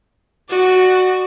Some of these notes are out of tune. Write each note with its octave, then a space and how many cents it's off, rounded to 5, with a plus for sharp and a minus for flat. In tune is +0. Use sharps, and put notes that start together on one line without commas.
F#4 +0 D5 +30